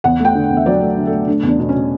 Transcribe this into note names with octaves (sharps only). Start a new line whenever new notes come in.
E2 F#5
A3
G5
D3
E2
E5
F#3 D5
A3
D3
A4
A3
A3 D4
E2
D4
B2 D4
C#4
B2